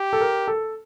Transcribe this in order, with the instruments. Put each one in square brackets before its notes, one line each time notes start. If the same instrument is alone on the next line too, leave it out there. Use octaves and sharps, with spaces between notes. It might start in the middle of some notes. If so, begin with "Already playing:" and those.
Already playing: [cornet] G4
[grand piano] A4
A#4
A4